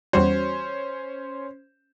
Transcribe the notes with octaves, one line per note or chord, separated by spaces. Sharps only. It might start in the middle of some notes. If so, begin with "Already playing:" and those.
E2 G3 C#4 F#4 C5